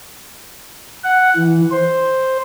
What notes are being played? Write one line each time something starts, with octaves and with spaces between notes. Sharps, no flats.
F#5
E3
C5